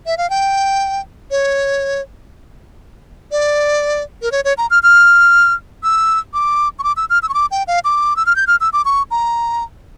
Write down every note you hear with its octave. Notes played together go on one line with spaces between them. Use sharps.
E5
F5
G5
C#5
D5
A#4
C#5
C#5
A#5
F6
F6
E6
D6
C#6
D6
E6
F6
E6
C#6
D6
G5
F5
D6
E6
F6
G6
F6
E6
D6
C#6
A#5